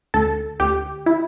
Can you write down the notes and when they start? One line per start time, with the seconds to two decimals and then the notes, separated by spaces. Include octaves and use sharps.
0.14 D2 A4
0.60 D2 G4
1.06 E4